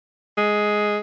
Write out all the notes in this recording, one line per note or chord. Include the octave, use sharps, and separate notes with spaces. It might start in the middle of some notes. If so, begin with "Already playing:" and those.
G#3